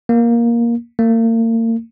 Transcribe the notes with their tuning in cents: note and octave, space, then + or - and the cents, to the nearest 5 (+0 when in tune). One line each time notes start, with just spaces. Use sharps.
A#3 +10
A#3 -40